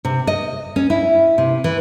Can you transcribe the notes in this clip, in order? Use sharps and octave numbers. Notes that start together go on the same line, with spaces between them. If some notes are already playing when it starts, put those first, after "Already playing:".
C3
D#5
C#4
E4
C3
E3